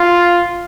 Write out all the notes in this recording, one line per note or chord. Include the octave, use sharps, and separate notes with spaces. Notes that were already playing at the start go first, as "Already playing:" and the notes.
Already playing: F4